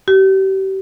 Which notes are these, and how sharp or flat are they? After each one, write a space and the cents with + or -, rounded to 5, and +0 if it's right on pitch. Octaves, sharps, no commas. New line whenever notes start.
G4 -35